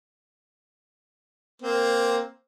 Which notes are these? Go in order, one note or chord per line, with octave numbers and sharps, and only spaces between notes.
A#3 C4